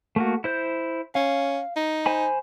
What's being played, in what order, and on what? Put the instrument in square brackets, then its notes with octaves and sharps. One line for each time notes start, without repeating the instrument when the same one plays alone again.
[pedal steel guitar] A3 A#3 F#4
E4 C5 G6
[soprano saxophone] C#4 [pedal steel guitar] F5
[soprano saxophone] D#4
[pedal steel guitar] C5 G#5 B5